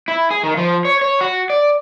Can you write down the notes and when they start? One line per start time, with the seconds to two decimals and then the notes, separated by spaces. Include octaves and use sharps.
0.08 E4
0.31 G#4
0.43 D#3
0.57 F3
0.85 C#5
1.01 C#5
1.21 F#4
1.50 D5